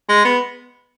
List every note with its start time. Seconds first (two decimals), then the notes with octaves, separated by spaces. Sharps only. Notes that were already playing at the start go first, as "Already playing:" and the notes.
0.09 G#3
0.25 B3